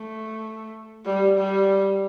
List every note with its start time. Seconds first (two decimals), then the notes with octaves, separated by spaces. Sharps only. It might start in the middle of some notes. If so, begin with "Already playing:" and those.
Already playing: A3
1.06 G3
1.37 G3